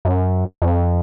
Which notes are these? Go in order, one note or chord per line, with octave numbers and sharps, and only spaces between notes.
F#2
F2